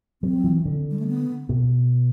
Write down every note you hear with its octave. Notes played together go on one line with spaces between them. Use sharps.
F#3 C4
E3
D3
G3
A3
B3
B2